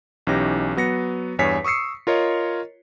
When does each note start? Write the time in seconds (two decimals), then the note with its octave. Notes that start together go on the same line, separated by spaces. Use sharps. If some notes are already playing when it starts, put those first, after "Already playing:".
0.27 B1 E3 C#4 D#4 G4 A#6
0.77 F#3 B3 A#6 C#7
1.39 E2 G2 C#5 G#5 B6 C7
1.65 C#6 D#6 E6 C7 C#7
2.07 F4 A#4 C#5 D#5